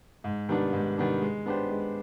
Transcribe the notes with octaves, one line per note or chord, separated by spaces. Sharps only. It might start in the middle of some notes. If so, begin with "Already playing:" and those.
G#2
D#3 G3 B3 D4
G#2
D#3 G3 B3 D4
G#3
B3 D4 G4 C5
G#3